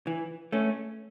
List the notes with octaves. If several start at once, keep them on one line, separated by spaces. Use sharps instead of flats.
E3
A3 C#4